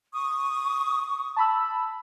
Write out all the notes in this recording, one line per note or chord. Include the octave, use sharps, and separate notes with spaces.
C#6 D#6
A5 B5 E6